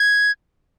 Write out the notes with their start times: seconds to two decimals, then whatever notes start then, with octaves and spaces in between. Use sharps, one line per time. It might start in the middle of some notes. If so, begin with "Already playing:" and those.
Already playing: G#6